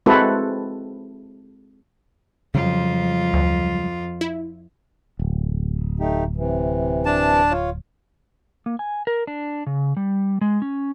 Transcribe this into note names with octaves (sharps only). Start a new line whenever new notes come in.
G#3 C4 E4 F#4 A4 B4
F2 C#3 F#3 G3 F4
D2
E4
D1
A3 D#4 G4
C3 E3
D4 A5
F4 C#5 F5
A#3
G#5
A#4
D4
C#3
G3
G#3
C#4